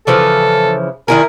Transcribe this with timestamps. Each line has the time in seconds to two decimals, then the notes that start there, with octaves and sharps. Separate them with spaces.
0.07 C#3 E3 F3 A4
1.08 D#3 E4 G#4 A#4